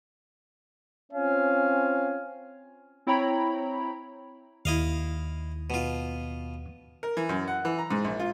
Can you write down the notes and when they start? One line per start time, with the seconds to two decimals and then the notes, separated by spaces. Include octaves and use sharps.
1.12 C4 C#4 F4 C#5 F5 G#5
3.07 C4 E4 C#5 G5 A#5 B5
4.65 D#2 E4 D#5 F5
5.70 B2 F4
7.03 A#4
7.17 E3
7.29 F#2
7.48 F#5
7.65 E3
7.78 A#5
7.90 G#2
8.04 A#1
8.20 F4